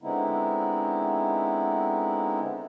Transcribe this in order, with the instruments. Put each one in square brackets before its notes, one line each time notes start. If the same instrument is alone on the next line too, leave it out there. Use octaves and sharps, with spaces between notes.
[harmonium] D3 G#3 B3 C4 D#4 E4